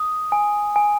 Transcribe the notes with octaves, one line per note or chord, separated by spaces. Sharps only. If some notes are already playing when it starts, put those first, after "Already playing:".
Already playing: D#6
G#5
G#5